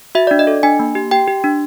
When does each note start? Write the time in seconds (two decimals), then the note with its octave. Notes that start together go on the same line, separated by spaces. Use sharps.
0.15 F#4 E5
0.27 D4 D5
0.39 D#5
0.47 A4
0.63 D4 G#5
0.79 A#3
0.95 G4
1.11 G4 G5
1.28 G4
1.44 D4